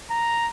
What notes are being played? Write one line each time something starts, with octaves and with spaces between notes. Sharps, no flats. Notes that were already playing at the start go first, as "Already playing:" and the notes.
A#5